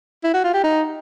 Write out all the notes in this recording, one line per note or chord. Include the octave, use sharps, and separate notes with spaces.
E4
F#4
F4
G4
D#4